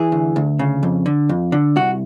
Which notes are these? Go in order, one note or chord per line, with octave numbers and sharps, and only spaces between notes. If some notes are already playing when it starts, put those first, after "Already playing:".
Already playing: E3 G#4
D2
D2
C#3
F2
D3
F2
D3
C2 F#4